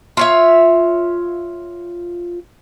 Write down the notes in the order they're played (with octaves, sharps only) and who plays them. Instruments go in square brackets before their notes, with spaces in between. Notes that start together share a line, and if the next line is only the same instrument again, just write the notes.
[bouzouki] F4 C#5 E5